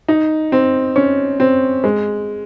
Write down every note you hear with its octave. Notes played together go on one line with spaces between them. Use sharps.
D#4
C4
C#4
C4
G#3